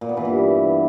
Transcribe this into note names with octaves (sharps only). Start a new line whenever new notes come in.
A#2
B3
E3
G2